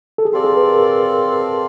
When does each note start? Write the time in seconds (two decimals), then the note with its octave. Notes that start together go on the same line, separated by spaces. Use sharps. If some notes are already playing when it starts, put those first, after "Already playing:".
0.18 A4
0.25 G#4
0.32 C4 F4 G4 A4 D5
0.44 G#4
0.56 B4
0.69 A#4